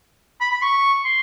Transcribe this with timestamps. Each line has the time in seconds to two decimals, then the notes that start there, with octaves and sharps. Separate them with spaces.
0.41 B5
0.51 B5
0.62 C#6
1.05 C6